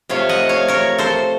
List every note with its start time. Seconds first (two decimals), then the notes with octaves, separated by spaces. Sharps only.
0.09 C3 F3 A3 C#5 F5
0.29 D#5 F#5
0.49 C#5 F5
0.68 A#4 C#5
0.98 A4 C5